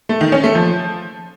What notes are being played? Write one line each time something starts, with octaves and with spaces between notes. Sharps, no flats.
A3
D#3
C#4
A3
F3